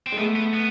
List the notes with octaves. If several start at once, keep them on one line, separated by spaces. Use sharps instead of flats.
C4
G#3
A3 B3
B3
B3